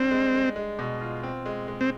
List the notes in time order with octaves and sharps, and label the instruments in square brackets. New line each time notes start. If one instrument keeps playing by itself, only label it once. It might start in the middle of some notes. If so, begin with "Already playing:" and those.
Already playing: [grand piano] G3 D4 [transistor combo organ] C4
[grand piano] G#3
G#3
G#3
B2
F4
C4
G#3
G#3
[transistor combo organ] C4